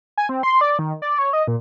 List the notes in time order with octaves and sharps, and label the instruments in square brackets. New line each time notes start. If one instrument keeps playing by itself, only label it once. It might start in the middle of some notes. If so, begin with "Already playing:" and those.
[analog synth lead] G#5
C4
C6
D5
D#3
D5
C#5
D#5
A#2